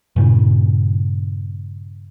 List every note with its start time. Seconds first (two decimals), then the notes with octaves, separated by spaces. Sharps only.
0.16 G2 A#2 C#3